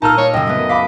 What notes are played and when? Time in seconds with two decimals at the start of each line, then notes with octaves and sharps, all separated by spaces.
0.02 A#2 D#4 A5 E6 F6
0.17 A#3 D#4 C#5
0.34 F#2 C#3 D#5 G5 E6
0.47 A3 B3
0.69 F5 B5 D6 B6